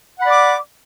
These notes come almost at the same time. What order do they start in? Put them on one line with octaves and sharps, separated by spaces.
F#5 B5 D5 D6